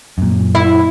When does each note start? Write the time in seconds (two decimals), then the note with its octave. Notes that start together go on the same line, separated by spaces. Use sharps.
0.18 F#2 A#2
0.55 E4